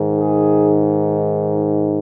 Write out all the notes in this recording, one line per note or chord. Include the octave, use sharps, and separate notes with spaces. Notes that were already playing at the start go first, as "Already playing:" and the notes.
Already playing: G#2 D#3
G#4